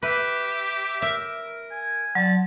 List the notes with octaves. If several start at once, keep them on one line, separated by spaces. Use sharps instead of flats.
G4 B4 E5
A#4 E5
G#5
F#3 D5 A5